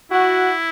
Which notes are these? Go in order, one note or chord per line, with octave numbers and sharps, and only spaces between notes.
E4 F#4